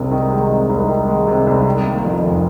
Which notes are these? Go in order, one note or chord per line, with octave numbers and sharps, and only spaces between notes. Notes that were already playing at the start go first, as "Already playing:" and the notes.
Already playing: C2 C3 D#3 G#3
D#3
G#3
C3
C2
D#3
G#3
C3
C2
D#3
A#3
F2
F1